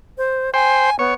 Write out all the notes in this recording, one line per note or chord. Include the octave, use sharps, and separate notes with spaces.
C5
C5 G5 G#5
B3 C#5